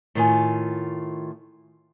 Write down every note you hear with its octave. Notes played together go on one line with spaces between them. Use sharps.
A2 D#3 F4 G#5